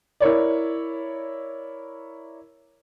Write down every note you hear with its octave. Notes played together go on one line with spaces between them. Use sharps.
E4 A#4 C#5 D5